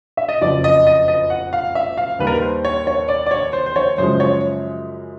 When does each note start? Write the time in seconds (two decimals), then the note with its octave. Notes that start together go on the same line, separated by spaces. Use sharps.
0.17 E5
0.29 D#5
0.41 F#1 F2 C#3 F3 D5
0.64 D#5
0.87 D#5
1.08 D#5
1.30 F#5
1.53 F5
1.75 E5
1.98 F5
2.19 D#2 D#3 G3 A#3 B4
2.27 A#4
2.34 B4
2.42 C5
2.65 C#5
2.87 C#5
3.09 D5
3.26 D5
3.31 C#5
3.53 C5
3.66 C5
3.76 C#5
3.98 F#2 C#3 F3 G#3 C5
4.20 C#5